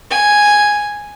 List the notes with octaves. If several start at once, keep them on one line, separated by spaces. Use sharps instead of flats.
G#5